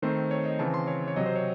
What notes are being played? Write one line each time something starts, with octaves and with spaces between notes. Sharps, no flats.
D#3 A3 C4 C5
C#5
D#5
C#3 E3 C4 A5
C6
C#5
C#5
C3 F#3 C4 D#5
C5
C#5